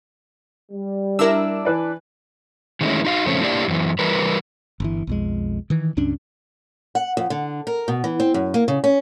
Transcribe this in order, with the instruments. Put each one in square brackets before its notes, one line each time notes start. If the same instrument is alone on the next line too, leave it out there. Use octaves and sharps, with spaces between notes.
[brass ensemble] G3
[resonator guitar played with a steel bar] D4 E4 [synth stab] A#4 E6
[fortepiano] E3 B4 D5
[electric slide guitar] D#3 E3 G#3 A3 C#4 E4
D#4 F#4 E5 F5
F2 C#3 F3 A3 C4 C#4
A#3 D4 E4 G4 D5 F5
F#2 E3
E3 G3 A#4 B4
[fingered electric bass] G1 E3
B1 F2 G#3
D#3 E3
C#2 G2 C#4 D4
[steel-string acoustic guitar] F#5
F2
D3
A#4
B2
E3
C4
F#2
A#3
C#3
C#4